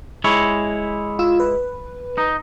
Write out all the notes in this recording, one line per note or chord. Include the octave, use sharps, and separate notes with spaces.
G#3 E4 C#5
F4 E6
B4
D#4